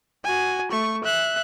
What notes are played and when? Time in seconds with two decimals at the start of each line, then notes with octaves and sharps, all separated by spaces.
0.24 F#4 G#5
0.71 A3 C#6
1.04 E5 F#6